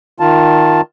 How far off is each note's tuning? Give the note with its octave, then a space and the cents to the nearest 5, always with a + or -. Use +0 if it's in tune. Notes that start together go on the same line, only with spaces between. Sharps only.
D#3 +0 F4 +0 A5 +0